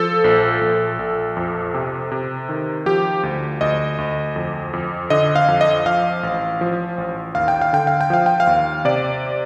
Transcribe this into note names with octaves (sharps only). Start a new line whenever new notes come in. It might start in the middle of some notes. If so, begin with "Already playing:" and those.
Already playing: F3 A4
A#1
A#1
A#1
F2
C3
C3
D#3
F3 G4
D2
D2 D#5
D2
F2
F2
D3 D#5
F5
F2
D#5
F3 F5
A1
F3
A1
D#2 F5
G5
F5
D3 G5
F5
G5
F3 F5
G5
F5
D#2
C3 D5